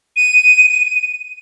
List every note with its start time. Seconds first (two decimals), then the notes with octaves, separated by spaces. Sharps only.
0.16 D#7